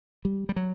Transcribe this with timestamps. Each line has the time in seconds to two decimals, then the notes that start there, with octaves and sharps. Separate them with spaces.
0.25 G3
0.49 G3
0.56 F#3